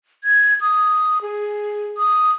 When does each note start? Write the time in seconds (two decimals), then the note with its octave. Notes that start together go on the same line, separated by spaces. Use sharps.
0.24 G#6
0.61 D#6
1.22 G#4
1.97 D#6